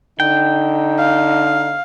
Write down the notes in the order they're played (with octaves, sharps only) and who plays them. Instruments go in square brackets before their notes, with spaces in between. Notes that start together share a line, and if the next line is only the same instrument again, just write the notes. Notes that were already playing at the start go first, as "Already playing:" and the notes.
[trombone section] D3 D#4 [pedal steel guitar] G5
[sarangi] F5